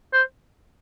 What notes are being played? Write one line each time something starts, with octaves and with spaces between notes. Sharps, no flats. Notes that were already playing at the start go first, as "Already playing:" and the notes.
C5